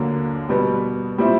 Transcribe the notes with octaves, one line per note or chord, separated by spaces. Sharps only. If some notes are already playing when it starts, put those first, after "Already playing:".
Already playing: D#2 D3 F#3 A#3
B2 G3 B3
A#2 G3 C4 E4